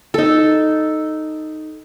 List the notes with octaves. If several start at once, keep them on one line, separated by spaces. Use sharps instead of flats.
D#4 A4